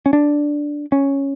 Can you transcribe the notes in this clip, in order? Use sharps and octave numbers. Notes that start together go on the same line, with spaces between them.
C#4
D4
C#4